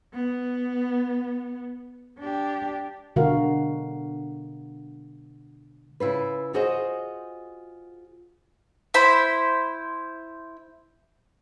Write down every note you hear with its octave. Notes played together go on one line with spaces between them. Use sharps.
B3
D4 G4
B2 D3 G#3 F#4 A#4 F5
C#3 E4 F4 B4
F4 F#4 G#4 C5 D#5
E4 C5 B5